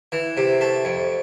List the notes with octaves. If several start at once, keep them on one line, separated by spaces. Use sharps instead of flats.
E3
C3
A3
F2